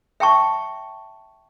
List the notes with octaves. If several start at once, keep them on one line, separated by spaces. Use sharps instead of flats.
E5 G5 A5 C#6